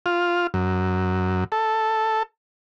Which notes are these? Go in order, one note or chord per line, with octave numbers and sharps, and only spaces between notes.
F4
F#2
A4